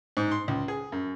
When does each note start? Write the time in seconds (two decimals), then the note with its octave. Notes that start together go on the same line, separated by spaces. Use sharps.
0.17 G#2
0.31 C6
0.48 C#2
0.68 G#4
0.92 F#2